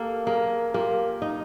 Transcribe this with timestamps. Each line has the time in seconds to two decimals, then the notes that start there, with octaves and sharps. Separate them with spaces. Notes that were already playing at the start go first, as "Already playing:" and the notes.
Already playing: A#3 G4 A4
0.26 A#3 G#4 A#4
0.74 A#3 F4 G4
1.22 D#4